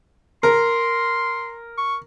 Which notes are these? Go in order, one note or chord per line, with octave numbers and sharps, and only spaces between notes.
A#4 C6
C#6